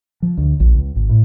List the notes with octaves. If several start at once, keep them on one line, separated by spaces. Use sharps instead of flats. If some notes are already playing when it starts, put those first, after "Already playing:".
F3
D2
A#1
C#2
G#1
A2